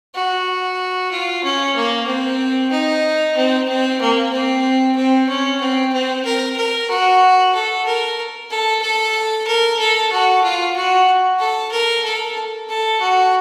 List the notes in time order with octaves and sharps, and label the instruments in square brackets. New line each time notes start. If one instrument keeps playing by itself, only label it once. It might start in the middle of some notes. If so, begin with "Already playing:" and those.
[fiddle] F#4
F4
C#4
A#3
C4
D#4
C4
C4
A#3
C4
C4
C#4
C4
C4
A#4
A#4
F#4
A4
A#4
A4
A4
A#4
A4
F#4
F4
F#4
A4
A#4
A4
A4
F#4